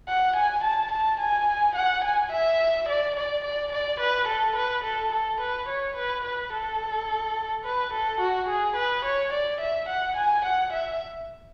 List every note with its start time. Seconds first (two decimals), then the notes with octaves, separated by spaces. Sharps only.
0.08 F#5
0.37 G#5
0.64 A5
0.92 A5
1.20 G#5
1.76 F#5
2.04 G#5
2.32 E5
2.89 D5
3.16 D5
3.45 D5
3.73 D5
4.00 B4
4.28 A4
4.56 B4
4.84 A4
5.13 A4
5.41 B4
5.69 C#5
5.96 B4
6.25 B4
6.53 A4
7.65 B4
7.93 A4
8.21 F#4
8.49 G#4
8.76 B4
9.05 C#5
9.33 D5
9.61 E5
9.89 F#5
10.17 G#5
10.45 F#5
10.73 E5